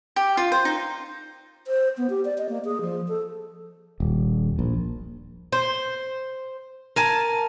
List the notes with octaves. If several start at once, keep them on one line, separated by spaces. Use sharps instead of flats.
G4
F4
C5
D#4
C5
B3
G4
D5
D#5
A#3
G#4
F3
A4
D#1
A#1
C5
A#4 G#5 A5